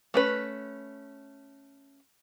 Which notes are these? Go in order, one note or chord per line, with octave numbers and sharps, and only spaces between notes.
A3 C#4 B4